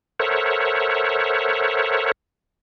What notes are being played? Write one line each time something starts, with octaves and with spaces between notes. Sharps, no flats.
A4 A#4 C5 C#5 E5 F#5